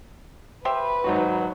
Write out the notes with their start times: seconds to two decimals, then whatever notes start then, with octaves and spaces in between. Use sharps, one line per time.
0.65 G4 B4 C5 E5
1.04 G#1 F#3 D#4 F#4